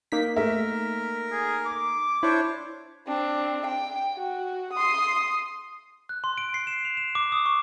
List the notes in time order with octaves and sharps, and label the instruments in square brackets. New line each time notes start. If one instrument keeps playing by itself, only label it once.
[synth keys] A#3 D#4 B6
[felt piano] A3 E5 [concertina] A#4
[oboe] G#4
D6
[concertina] D4 C5 C#5 [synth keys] E4
[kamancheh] C4 D4
G5
F#4
C6 D#6
[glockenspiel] F#6
C6
D7
C7
E7
F7
E7
D6
D#6
C#6